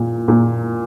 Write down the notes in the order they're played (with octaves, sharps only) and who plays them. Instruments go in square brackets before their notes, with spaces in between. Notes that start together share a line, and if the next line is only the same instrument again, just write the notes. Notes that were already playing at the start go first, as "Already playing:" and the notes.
Already playing: [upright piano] A#2
A#2